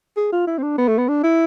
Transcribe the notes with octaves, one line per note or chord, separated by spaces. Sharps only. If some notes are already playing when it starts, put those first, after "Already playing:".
G#4
F4
E4
C4
D4
B3
A3
B3
D4
E4